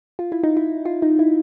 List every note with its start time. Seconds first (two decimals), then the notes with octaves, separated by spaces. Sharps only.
0.19 F4
0.32 E4
0.44 D#4
0.57 E4
0.85 F4
1.02 D#4
1.19 E4